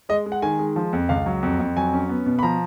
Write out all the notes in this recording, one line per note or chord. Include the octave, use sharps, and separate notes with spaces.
G#3 D#5
G#3
F#5
D#3 G#5
G#3
F3
F2
C#2 F5
F#3
F2
F2
F#3 G#5
C#4
B3
B2
B5
F3 A#5